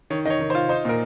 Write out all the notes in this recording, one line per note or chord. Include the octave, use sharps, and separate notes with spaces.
D#3 C#5
D#3 C#5 D#5
D#3
C5
F4
D#4 C5
A#2 A#4